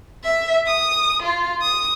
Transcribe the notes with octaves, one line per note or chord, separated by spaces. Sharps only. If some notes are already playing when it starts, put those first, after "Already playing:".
E5
D#6
F4
D#6